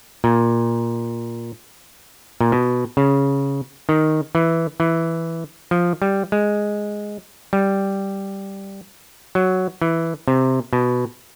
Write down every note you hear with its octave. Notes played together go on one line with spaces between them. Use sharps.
A#2
A#2
B2
C#3
D#3
E3
E3
F3
G3
G#3
G3
F#3
E3
C3
B2